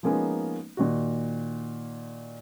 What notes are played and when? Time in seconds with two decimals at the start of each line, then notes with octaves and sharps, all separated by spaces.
0.03 F3 G#3 A#3 B3 C#4 D#4
0.77 A#2 D#3 F#4